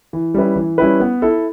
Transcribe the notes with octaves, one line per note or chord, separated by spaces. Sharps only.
E3
G3 C#4 E4 B4
E3
G3 C#4 E4 B4
B3
E4 A4